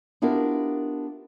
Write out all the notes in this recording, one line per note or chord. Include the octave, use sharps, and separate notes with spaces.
B3 D4 E4 F4 G4 A#4